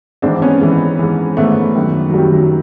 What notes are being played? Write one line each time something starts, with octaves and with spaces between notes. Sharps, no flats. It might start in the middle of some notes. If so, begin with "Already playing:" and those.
G#2 E3 C4 D4
B3 C#4
G#2 E3
G#2 E3
G#2 E3 A3 B3
F#2 D#3
F#3
F#2 D#3 G3
F#3